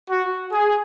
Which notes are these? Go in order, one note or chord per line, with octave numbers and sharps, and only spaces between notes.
F#4
G#4